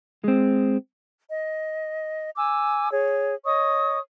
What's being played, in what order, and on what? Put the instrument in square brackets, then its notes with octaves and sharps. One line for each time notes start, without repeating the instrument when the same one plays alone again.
[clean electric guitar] G#3 C4
[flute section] D#5
G#5 D6 E6
G#4 C#5
C#5 D#5 C#6 D#6